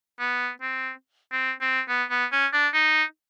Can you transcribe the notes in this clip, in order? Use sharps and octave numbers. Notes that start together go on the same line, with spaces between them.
B3
C4
C4
C4
B3
B3
C#4
D4
D#4